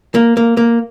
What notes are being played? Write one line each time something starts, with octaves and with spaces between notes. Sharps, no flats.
A#3
A#3
A#3